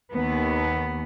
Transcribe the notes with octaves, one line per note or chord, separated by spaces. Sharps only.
D#2 B3